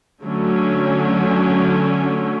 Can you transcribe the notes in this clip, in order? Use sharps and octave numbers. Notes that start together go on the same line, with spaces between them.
D3 F#3 A3 C#4